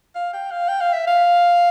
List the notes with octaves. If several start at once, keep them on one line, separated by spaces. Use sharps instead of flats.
F5
G5
F5
G5
F5
E5
F5